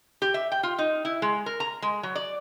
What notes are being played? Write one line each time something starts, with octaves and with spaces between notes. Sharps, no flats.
G4
E5
G5
F4
D#4
E4
G#3
A#4
A#5
G#3
F#3
D5